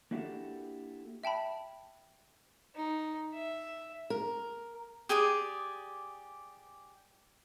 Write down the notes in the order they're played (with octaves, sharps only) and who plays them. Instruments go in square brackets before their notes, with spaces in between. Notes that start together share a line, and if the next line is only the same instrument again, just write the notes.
[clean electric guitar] A#3 D4 E4 F#4 G4 A4
[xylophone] E5 G5 A5 B5
[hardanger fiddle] D#4
E5
[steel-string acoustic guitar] A#4
[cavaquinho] G4 G#4 D5 D#6